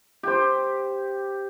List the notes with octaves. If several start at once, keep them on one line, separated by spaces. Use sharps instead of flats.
G4 C5